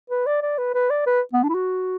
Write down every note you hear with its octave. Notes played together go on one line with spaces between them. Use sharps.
B4
D5
D5
B4
B4
D5
B4
B3
D4
E4
F#4